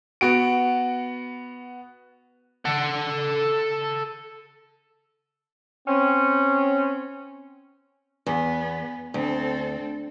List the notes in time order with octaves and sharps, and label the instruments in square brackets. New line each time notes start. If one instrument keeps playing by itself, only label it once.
[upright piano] B3 F#4 D7
[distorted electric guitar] A4 F#5
[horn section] C4 C#4
[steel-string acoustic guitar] E2 [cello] B3
[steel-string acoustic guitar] D2 [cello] C4 A4